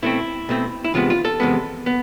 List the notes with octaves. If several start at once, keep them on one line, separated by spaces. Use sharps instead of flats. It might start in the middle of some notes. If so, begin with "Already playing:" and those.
B2 A3 C4 E4
B2 A3 C4
E4
E2 C3 G#3 B3 F4
F4
A4
E2 C3 G#3 B3
B3